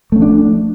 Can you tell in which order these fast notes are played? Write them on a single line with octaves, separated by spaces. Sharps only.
A3 C#4 F3 D4